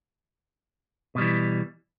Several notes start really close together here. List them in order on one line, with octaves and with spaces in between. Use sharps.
B2 G3 E3